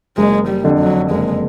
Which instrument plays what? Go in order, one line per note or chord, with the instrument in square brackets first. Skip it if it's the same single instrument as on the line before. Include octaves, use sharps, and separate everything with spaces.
[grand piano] F#1 [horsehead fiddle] G#3
[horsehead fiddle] G3
[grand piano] F2 D3
[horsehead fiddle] F#3
[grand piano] F#1 [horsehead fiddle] G#3